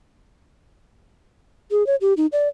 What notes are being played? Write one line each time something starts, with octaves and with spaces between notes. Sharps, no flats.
G#4
C#5
G4
D#4
D5